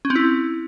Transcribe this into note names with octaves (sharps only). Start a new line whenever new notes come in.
C#4
C4
E4